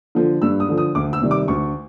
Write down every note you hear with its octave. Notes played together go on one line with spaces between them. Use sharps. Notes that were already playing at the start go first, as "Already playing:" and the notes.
D3 F3
G2 E6
D#6
D3 F3
D#6
D2 D6
E6
C3 D#3 G3
D6
D2 C#6